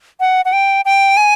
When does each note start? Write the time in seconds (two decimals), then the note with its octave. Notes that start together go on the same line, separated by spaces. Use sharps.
0.20 F#5
0.45 F#5
0.53 G5
0.85 G5
1.17 G#5